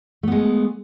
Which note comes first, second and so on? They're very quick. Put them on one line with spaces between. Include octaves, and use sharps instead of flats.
A3 B3 G#3